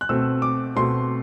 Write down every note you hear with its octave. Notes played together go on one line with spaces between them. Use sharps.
F#6
B2 A3 C4 E6
D6
B2 A3 C4 C6